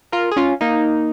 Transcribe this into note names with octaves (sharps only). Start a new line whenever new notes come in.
F4 A#4
G#4
C#4 F4
A#3 D#4